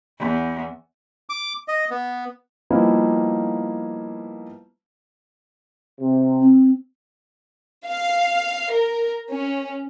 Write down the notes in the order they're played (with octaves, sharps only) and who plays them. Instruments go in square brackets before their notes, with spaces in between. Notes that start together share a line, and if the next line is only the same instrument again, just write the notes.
[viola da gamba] E2
[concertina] D6
D#5
B3
[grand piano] F3 G3 A#3 B3 D#4 E4
[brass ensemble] C3
[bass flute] C4
[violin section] F5
A#4
C#4